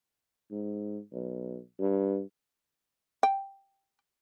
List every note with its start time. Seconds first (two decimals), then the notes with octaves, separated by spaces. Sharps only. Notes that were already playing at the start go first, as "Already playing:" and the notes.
0.51 G#2
1.13 B1
1.79 G2
3.23 G5